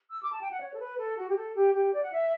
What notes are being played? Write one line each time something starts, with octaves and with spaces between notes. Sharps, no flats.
E6
D6
A5
G5
F#5
C#5
A4
B4
A4
F#4
G4
A4
G4
G4
D5
F#5
E5